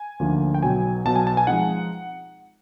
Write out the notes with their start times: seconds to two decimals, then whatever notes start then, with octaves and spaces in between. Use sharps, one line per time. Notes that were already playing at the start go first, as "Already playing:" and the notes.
Already playing: G#5
0.20 D2 D3 F3 A#3 D#4
0.54 G5
0.63 B1 B2 F#3 G#5
1.05 B1 B2 F#3 A5
1.16 G#5
1.27 A5
1.37 G#5
1.47 F3 G#3 C4 D#4 F#5